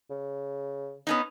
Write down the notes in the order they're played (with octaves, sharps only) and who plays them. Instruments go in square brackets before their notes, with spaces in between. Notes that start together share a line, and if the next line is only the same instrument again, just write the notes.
[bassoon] C#3
[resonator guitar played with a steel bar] B3 C#4 D#4